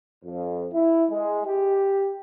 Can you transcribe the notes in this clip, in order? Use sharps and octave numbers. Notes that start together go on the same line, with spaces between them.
F2
E4
G#3
G4